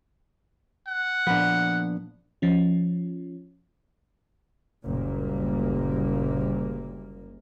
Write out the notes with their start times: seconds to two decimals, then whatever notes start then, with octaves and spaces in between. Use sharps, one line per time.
0.87 F#5
1.27 A#2 F3 B3 D4
2.42 F3 C#4
4.84 F#1 D2 A#2 G3 A#3